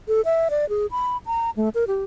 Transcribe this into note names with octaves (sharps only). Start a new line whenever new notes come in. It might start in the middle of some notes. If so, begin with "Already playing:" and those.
A4
E5
D5
G#4
B5
A#5
A3
A#4
G4